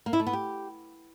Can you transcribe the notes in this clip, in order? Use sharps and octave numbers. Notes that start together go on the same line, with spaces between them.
A#3
E4
A3
B3
G4